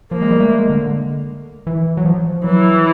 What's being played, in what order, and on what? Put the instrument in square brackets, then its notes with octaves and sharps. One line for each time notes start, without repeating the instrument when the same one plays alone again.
[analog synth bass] F3 [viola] A#3
[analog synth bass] G#3
G3
A3
G#3
D3
E3
F#3
F3
[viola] E3 [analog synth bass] F#3